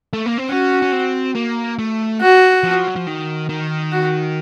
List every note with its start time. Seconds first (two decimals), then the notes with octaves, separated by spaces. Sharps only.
0.13 A3
0.26 A#3
0.38 C4
0.49 C#4 F#4
0.82 C#4
0.92 C4
1.35 A#3
1.79 A3
2.21 F#4
2.63 F3
2.87 F#3
2.96 F3
3.07 D#3
3.49 D#3
3.92 F#4